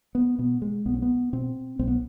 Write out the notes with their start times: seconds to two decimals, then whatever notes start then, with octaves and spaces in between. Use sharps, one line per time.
0.15 B3
0.39 B2 B3
0.62 G#3
0.85 B1 B3
0.94 C4
1.02 B3
1.33 B2 C4
1.79 B1 C4
1.88 B3